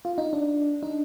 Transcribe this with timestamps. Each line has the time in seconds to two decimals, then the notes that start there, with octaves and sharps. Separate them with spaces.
0.05 F4
0.18 D#4
0.33 D4
0.83 D#4